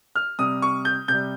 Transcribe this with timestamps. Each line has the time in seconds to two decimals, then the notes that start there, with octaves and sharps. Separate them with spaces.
0.15 F6
0.39 C3 G3 D#6
0.62 C#6
0.85 G6
1.08 C3 G6
1.13 G3